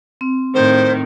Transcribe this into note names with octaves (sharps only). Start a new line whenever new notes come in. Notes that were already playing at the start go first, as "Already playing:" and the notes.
C4
A2 D#3 C5